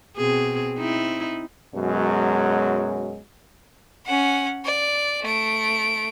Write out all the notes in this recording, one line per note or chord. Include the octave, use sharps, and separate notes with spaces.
B2 C4 G#4
C4 D#4 E4
F#2 B2 F#3 G#3
C#4 F#5
D5
A3 D7